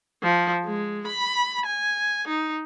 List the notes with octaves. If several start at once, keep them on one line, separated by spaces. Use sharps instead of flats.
F3
G#3
B5
G#5
D#4